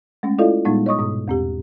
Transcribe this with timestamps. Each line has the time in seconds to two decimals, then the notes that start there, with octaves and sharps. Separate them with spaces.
0.23 G#3 A3 C#4
0.39 E4 F4 A4 D5 D#5 F5
0.65 A#2 G3 G#3 B3 D#4
0.86 C#5 D#5 C#6 D#6
0.99 G#2 B2 D#6
1.28 E2 C4 G4